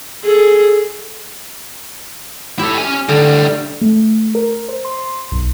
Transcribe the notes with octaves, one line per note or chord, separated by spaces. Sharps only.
G#4 A4
E4 G4 A4
C#4 G#5
A2 D3 G3
A3
A#4
C5
C6
B1